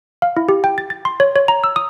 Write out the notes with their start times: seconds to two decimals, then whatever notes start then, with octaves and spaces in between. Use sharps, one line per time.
0.22 F5
0.37 E4
0.49 G4
0.64 G5
0.78 A6
0.90 A6
1.05 C6
1.20 C#5
1.36 C#5
1.48 A#5
1.64 E6
1.76 D#6